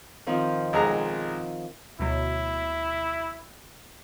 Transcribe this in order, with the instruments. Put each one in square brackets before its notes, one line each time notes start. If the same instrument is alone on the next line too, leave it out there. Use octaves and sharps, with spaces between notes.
[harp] D#3 F3 C4
[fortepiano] B1 G#3 A#5
[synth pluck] D2 B2 F#3 [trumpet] E4